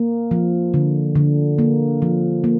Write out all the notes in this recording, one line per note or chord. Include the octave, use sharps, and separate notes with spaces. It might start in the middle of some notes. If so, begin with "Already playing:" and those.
Already playing: A#3
F3
D3
D3
A#3
F3
A#3